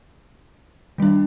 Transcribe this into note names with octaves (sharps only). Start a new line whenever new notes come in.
D#3 G3 D4